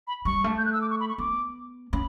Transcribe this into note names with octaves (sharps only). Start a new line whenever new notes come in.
B5
G3 C#6
A3
G6
F#6
E6
D6
C#6
B5
C#6
B3 D6
C#4 B5